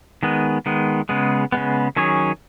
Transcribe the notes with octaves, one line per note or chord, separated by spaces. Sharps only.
D#3 G#3 B3
D#3 G#3 B3
C#3 G#3 B3
C#3 G#3 B3
D#3 F#3 C#4 G#4 C#5